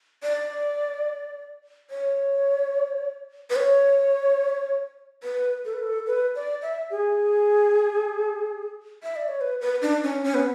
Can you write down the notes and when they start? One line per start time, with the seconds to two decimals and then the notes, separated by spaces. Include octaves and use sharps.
0.23 D5
1.90 C#5
3.50 B4
3.56 C#5
5.23 B4
5.65 A4
5.74 B4
5.83 A4
6.07 B4
6.35 D5
6.62 E5
6.91 G#4
9.03 E5
9.16 D5
9.28 C#5
9.41 B4
9.61 B4
9.82 D4
10.03 C#4
10.24 C#4
10.34 B3